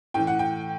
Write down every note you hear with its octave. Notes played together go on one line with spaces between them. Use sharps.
A2 E3 G5
F#5
G5